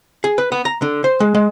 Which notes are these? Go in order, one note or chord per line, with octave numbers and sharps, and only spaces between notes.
G#4
B4
B3
A#5
D3
C5
G#3
G#3